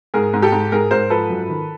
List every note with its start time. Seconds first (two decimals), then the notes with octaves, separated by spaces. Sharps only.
0.14 G#2 G#4 A#4
0.33 G#2
0.42 G4 A4
0.52 G#2
0.72 G#2 G#4 A#4
0.91 G#2 A#4 C5
1.10 F3 A4 B4
1.30 F#2
1.49 D#3